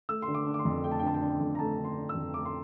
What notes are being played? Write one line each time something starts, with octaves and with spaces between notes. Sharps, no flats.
A3 E6
C6
D3
D6
D4
D6
C6
F2
A3 G5
A5
G5
D3 A5
G5
D4 A5
G5
F2
A#5
A3 A5
D3
C6
D4
E6
F2
A3 D6
C6